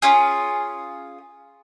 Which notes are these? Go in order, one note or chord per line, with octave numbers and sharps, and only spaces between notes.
C#4 F4 G#4